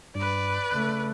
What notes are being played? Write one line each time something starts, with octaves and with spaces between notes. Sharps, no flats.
G2 B4 D5
C#3 A3 F#6